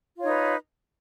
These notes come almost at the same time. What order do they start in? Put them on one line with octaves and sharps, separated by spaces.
F4 C#5 D#4 B4